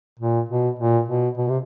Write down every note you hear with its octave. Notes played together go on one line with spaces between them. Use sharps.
A#2
B2
A#2
B2
B2
C3